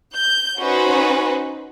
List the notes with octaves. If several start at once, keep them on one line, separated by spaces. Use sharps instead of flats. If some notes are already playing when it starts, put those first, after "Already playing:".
G6
C#4 D#4 F#4 B4 C5